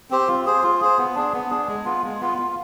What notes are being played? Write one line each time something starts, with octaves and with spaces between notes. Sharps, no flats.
C4 G4 C5
F4
G#4 C5
F4
G#4 C5
B3
D4 G#4
B3
D4 G#4
G#3
B3 F4
G#3
B3 F4
F4